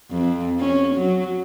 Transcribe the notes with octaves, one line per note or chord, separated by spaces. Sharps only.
F2
C#4
F#3